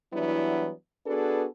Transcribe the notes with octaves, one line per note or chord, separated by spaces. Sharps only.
E3 F#3 G3 B3 D4 E4
B3 D4 F#4 G#4 A4 B4